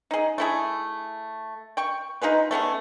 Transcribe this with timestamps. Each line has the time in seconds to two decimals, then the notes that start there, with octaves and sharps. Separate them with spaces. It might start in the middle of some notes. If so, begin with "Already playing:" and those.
0.11 D#4 G#4
0.38 A3 E4 G#4
1.77 G5 C#6
2.22 D#4 F4 G#4 B4
2.51 A3 B3 C#4 G#4